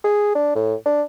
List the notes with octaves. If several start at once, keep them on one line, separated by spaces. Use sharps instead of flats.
G#4
D4
A2
D4